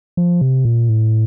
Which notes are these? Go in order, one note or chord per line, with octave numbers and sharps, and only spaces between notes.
F3
C3
A#2
A2